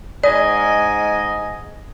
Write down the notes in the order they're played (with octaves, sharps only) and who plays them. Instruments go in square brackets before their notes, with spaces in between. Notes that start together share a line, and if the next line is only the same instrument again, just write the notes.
[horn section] G#2 D#5 G#5 [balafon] D5